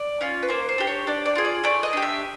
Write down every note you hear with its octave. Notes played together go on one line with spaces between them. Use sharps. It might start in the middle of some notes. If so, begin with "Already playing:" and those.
Already playing: D5
C#4 F4
B4
A#3 C5
C5
D4 G4
C#5
D4 D5
D5
F4 G#4
D5
A3 D5
D#5
D4 G4
E5